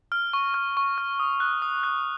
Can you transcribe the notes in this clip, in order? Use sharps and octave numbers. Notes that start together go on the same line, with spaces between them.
F6
C#6
F6
C#6
F6
D#6
F#6
D#6
F#6